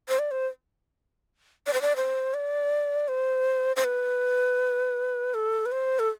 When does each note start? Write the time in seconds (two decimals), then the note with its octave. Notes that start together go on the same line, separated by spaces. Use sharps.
0.09 C5
0.19 D5
0.31 C5
1.67 D5
1.73 C5
1.82 D5
1.96 C5
2.34 D5
3.08 C5
3.76 C5
3.84 B4
5.34 A4
5.66 B4
5.72 C5
5.99 A4